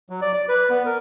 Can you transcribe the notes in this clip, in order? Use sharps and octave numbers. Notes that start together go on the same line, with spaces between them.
F#3
D5
D5
B4
B3
A#4